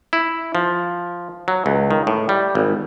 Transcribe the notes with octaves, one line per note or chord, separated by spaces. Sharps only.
E4
F3
F#3
C#2
D#3
A2
G3
G#1